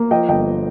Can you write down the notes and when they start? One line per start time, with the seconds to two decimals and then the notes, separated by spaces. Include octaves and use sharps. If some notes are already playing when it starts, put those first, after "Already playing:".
Already playing: A#3
0.11 F3 D#5 G5
0.29 G1 D#5 G5